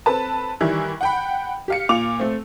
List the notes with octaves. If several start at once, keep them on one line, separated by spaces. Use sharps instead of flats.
C4 A4 B4 A5
D#3 E3 G3 E4
F#5 G5 B5
G4 F5 C#7
A#2 F4 D6 F7
A3 C4